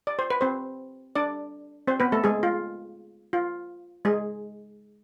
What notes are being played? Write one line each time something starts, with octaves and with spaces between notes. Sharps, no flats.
D5
C5
B4
C4 C5
D4 D5
C4 C5
B3 B4
A3 A4
G#3 G#4
F4
F4
G#3 G#4